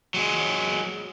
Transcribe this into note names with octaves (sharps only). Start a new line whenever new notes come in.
F#3 G#3